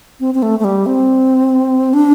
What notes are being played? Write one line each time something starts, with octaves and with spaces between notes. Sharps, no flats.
C4
C4
A3
A3
G3
C4
D4